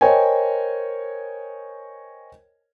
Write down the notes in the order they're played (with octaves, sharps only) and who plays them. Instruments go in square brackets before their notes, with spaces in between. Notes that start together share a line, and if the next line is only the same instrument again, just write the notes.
[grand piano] A#4 C5 C#5 D#5 G5 G#5